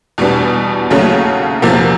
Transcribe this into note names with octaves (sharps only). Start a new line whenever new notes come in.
E2 B2 G3 B3 D4
D#2 C#3 F#3 A3 C#4
E2 C3 F3 A#3